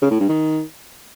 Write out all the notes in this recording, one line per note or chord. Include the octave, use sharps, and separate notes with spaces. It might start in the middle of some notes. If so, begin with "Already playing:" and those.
C#3
A2
G2
D#3